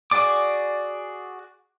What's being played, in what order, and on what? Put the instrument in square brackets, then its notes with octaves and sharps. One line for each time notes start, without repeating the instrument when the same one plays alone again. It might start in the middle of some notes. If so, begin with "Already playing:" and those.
[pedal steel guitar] F#4 G#4 D5 D6